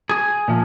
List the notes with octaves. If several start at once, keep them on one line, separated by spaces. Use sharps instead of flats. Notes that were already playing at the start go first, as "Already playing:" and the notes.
G#4
A#2 F3